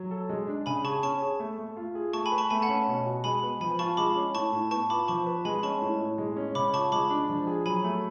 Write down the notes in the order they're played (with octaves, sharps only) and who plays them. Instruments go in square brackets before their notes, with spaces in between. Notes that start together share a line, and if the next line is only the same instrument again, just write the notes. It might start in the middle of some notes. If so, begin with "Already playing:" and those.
Already playing: [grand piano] F#3
A4
G#3
D4
[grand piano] C#3 [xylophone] G#5 B5
[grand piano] G#4 [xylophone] A5 C#6
[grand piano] C#4 [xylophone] A5 C#6
[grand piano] G#4
A3
A3
F4
G#4
[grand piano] A3 [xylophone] A5 C#6
[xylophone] G#5 B5
[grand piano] B4
[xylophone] A5 C#6
[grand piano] A3 [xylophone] G#5 B5
[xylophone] F#5 A5
[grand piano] C#4
B2
F#4
[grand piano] G#3 [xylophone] G#5 B5
[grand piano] B3
[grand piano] F3 [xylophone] G#5 B5
[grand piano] F4 [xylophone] A5 C#6
[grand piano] G#3 [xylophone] B5 D6
[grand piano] C#4
[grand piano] A2 [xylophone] A5 C#6
[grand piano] A2
[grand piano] B3 [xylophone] A5 C#6
[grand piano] F4 [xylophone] B5 D6
[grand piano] F3 [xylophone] A5 C#6
[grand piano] B4
[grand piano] G#3 [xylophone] G#5 B5
[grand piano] C#4 [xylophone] A5 C#6
[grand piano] A2
A2
G#3
C#4
[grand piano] C#3 [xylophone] B5 D6
[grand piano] F4 [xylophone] A5 C#6
[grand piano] G#3 [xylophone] B5 D6
[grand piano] D4
F3
G#4
[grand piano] F#3 [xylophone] G#5 B5
[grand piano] A3